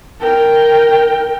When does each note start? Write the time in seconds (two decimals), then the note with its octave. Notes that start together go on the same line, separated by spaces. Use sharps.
0.20 A#4 G5